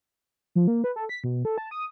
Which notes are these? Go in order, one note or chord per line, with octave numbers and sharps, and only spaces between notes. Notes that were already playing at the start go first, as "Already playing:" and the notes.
F3
A#3
B4
A4
B6
B2
A4
A5
D#6